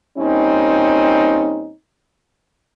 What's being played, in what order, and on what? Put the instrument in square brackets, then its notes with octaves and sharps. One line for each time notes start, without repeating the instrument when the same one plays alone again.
[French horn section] A#2 G3 C4 C#4 D#4